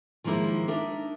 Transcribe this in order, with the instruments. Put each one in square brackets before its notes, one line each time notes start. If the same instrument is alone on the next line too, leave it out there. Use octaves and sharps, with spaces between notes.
[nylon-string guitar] D#3 F3 G#3 A#3 E4
D4 D#4 A#4 E5